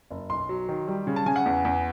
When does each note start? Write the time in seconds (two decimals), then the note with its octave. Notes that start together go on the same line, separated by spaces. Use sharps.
0.11 F#1
0.30 B1 C6
0.49 F#3
0.69 D#3
0.88 G3
1.07 C#3
1.16 A5
1.26 C#3 G#5
1.36 F#5
1.46 E2
1.65 E2